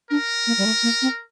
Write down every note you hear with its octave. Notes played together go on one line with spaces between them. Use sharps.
D4 A#4
A#3
G3
A3
A#3
C4